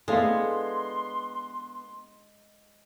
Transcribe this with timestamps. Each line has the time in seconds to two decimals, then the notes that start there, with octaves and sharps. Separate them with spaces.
0.08 G#3 B3 D4 E4 G#4 A4 F5 C6